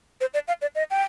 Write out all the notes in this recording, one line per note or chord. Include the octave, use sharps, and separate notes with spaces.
C5
D5
F5
D5
D#5
G5